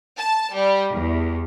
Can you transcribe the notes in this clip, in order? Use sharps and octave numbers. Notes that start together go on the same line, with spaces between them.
A5
G3
E2